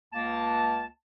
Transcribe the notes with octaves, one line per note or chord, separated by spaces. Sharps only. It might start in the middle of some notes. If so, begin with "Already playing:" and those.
C#2 A#3 A5